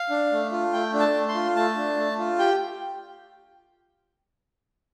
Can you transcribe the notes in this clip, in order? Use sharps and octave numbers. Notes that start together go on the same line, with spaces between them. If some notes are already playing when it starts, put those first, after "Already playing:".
Already playing: F5
D4
A3
F4
A3 G5
D4
A5
A3
C6
F4
A3 A5
D4
A3
F4
G4 G5